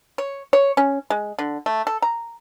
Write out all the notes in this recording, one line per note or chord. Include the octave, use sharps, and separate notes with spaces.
C#5
C#5
C#4
G#3
D3
A3
A4
A#5